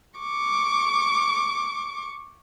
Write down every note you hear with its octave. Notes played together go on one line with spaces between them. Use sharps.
C#6 D6